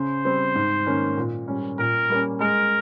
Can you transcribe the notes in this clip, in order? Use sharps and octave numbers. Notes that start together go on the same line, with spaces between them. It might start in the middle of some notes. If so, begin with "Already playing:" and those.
Already playing: C#3 C5
G3 C4
G#2
D#3 A#3 C#4
A#2
G3 C#4
A#2 A#4
G3 A#3 C#4
G#3 A#4